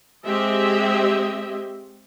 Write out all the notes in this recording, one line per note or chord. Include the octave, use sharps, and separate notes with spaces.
G#3 C4 G4 D#5 E5